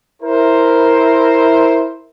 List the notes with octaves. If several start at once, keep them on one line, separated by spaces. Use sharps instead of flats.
E4 A#4 C5